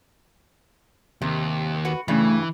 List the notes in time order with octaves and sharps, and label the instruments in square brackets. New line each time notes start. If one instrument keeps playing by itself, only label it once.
[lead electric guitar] D#2 [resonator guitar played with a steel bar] C3
[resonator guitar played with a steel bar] F#4 B4
[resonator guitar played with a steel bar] G2 C#3 [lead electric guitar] E3 [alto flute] A3